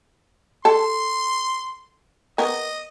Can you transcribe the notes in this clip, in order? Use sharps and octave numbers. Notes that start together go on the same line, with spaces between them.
A4 C6
B3 A#4 D#5